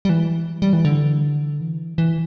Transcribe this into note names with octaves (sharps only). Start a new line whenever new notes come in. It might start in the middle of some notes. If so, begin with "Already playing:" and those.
G3
E3
G3
E3
D3
E3
E3